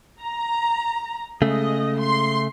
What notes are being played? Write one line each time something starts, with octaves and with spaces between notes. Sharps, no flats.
A#5
C#3 G#3 A3 D#5
C6